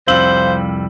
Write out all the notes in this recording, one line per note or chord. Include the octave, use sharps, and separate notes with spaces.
C2 F2 G3 C5 F5 E6 F#7